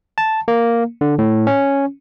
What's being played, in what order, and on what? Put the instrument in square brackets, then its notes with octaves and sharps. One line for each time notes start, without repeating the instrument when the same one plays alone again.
[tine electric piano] A5
A#3
D3
A2
C#4